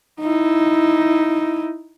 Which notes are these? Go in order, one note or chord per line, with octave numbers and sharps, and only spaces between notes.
D#4 E4